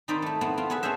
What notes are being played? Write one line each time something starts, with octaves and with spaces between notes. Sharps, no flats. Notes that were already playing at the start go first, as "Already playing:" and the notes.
D#3 C4 D#4 C5 D5 B5
A3 E4
B3 C4 E4
C4 F4
B3 G#4 B4 E5
C#4 G#4 A4 C5 E5